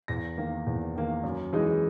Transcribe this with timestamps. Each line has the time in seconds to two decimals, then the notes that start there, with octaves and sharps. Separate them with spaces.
0.08 E2 A#6
0.38 D#3 A#3
0.67 E2
0.96 D#3 A#3
1.24 F#2
1.53 E3 G#3 D#4